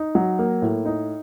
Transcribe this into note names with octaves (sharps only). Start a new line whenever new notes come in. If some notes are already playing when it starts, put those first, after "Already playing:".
Already playing: D#4
F#3
A#3
A2
D#4